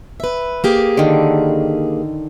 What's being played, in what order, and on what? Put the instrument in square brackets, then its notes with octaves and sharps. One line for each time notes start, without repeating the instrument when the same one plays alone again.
[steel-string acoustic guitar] B4 E5
A#3 G4 G#4
[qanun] D3 D#3